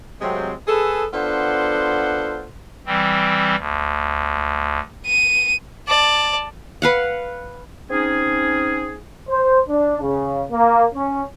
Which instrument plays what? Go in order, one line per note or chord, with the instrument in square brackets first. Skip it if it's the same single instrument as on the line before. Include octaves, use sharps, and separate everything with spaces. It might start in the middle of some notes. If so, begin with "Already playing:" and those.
[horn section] C3 F#3 G#3 A3 C4
G#4 A4 B4
B3 D4 F4 A4 C5 F#5
[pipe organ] E3 G3 C4
D2
[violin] D#7
[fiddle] D5 A5
[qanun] B4 F5 F#5
[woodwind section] C4 C#4 D#4 G#4
[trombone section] C5
D4
C#3
A#3
C#4